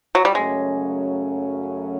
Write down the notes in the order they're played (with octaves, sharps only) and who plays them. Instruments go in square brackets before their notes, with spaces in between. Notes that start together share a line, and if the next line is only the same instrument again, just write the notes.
[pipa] F#3
G3
[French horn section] F#2 C#3 F#3 A3 C#4 [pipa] G#3